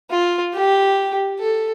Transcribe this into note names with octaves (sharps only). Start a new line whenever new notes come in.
F4
G4
A4